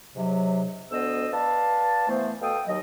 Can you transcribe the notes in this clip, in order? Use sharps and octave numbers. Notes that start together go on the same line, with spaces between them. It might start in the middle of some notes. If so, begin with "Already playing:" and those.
G#2 C3 F#3
D2 B3 C5 D#5 E6
B4 D5 F5 A5
E3 A3 B3 C5
B2 A4 F5 G5 D#6
D#2 F#3 D#5